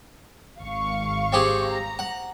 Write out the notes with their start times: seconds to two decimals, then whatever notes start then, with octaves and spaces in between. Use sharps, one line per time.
0.61 G#1 F5 C#6
1.33 C4 G4 G#4
1.67 A#5
1.99 F#5